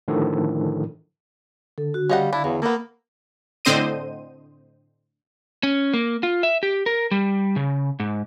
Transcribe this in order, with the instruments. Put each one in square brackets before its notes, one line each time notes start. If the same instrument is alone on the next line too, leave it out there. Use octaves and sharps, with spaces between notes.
[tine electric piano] A2 D3 D#3 F3 D#4 A4
[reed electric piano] D3 [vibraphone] A4
[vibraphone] F#4
[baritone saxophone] G3 [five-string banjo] C#4 D#5 F#5 [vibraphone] F5
[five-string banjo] D4 [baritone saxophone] E4
[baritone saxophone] E2 [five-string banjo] F#3
[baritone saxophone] A#3 [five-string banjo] B3 A4
[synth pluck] A2 D3 C4 C5 D#5 D#7
[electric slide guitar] C#4
A#3
F4
E5
G4
A#4
G3
C#3
G#2